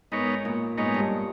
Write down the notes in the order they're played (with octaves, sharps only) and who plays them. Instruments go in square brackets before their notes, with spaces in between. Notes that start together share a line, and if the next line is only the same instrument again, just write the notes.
[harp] G#2 [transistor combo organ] B3 D#4 A#4 C#5
[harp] A#2
[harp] G#2 [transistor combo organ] B3 D#4 A#4 C#5
[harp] G2